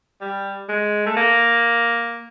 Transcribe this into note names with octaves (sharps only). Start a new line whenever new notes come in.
G3
G#3
A3
A#3